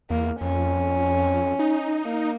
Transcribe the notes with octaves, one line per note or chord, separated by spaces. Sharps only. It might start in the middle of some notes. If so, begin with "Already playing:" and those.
E2 A#3
F2 C#4
D#4
A#3